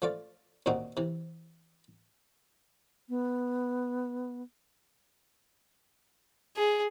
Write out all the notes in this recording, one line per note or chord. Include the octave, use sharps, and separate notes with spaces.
F3 A3 F4 D5
D#2 A#2 C4 D#4 F#4
C3 E3
B3
G#4